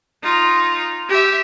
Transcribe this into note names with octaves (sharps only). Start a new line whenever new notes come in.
D#4 F4
G4 E5